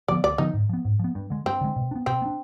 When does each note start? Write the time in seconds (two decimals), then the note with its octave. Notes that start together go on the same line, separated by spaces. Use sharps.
0.08 D3 F3 B3 D5
0.23 D2 D5
0.38 D3 F3 B3 D#4
0.54 G#2
0.69 F3 B3
0.85 G#2
0.99 F3 B3
1.15 G2
1.30 D3 G#3
1.46 G2 C4
1.61 D3 G#3
1.76 B2
1.91 D4
1.95 B3
2.06 B2 C4
2.22 B3
2.26 D4